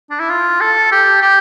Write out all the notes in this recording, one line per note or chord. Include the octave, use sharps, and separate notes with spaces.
D4
E4
F4
A4
G4
G4